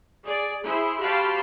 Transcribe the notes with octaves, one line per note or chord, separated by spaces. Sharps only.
G#4 D5
E4 G#4 C5
F#4 G4 C5 F5 A5 B5